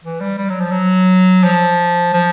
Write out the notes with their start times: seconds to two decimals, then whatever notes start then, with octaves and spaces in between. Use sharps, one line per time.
0.04 E3
0.21 G3
0.38 G3
0.50 F#3
0.61 F3
0.71 F#3
1.44 F3
2.13 F3